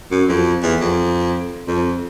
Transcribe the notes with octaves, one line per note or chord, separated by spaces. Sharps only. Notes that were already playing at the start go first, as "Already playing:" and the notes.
F#2
F2
E2
F2
F2